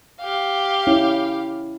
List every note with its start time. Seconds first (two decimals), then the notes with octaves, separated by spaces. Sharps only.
0.19 G4 F5
0.87 C#4 E4